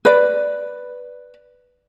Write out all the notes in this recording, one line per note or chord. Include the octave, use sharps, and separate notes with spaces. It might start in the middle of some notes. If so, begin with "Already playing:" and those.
B4 D5